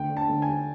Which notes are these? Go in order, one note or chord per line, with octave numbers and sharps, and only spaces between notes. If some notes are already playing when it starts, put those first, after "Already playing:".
Already playing: D2 G5
D3
A5
D2
G#5
G3